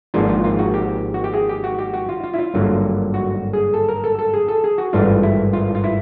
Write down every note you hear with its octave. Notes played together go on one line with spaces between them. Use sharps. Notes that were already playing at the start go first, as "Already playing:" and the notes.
G#1 G#2 F3 A#3 D4 F4
F4
F4
F#4
G4
F#4
G4
G#4
G4
F#4
G4
F#4
F4
F4
E4
F4
G#1 G2 D3 F#3 A#3
F#4
G#4
A4
A#4
A4
A4
G#4
A4
G#4
F#4
G#1 G2 E3 A3 D4 F4
E4
F4
F4
E4